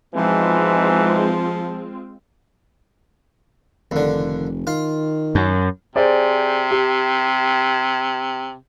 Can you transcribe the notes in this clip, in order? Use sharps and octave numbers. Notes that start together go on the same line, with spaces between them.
G#2 B2 E3 F3 G#3 C4 F4
F1 D#2 D3
D#3 F4
F#2
C3 G#4 C5 D5
G4